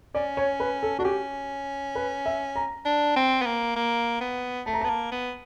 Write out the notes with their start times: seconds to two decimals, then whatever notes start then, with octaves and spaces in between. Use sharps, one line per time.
0.15 C#4 D5
0.37 C#5
0.60 B4
0.83 A4
0.99 D4 F#4
1.04 C#4 G4
1.95 B4
2.26 E5
2.56 A#5
2.85 D4
3.16 C4
3.42 B3
3.46 A#3
3.76 A#3
4.21 B3
4.66 A3 A5
4.73 A#5
4.81 B3 A5
4.89 A#3
5.12 B3